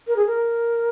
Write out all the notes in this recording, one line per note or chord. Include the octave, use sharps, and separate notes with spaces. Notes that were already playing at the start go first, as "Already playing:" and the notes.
A#4
G#4
A#4